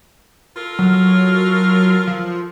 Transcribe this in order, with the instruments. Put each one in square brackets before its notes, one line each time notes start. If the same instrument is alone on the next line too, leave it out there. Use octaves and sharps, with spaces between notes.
[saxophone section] F4 A4 A#4
[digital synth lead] F#3
F3